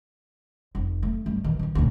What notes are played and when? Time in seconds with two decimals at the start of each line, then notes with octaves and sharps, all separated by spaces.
0.75 F1
1.03 A3
1.26 G2 A3
1.44 D#3 E3
1.59 D#3 E3
1.75 D#1 D2